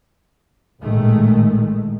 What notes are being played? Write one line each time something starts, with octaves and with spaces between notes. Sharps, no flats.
A1 A#2 D#3 G#3 A3